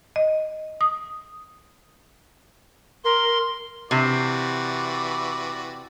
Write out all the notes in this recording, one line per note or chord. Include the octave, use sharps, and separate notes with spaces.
D#5
D#6
A#4 C6
C3 E3 F#4 D5